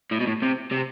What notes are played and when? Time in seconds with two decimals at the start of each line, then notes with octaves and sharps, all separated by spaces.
0.12 A2
0.21 B2
0.27 A2
0.43 C3
0.72 C3